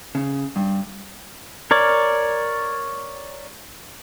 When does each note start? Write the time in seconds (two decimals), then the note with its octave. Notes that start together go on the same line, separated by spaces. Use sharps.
0.15 C#3
0.56 G2
1.71 A#4 C#5 D5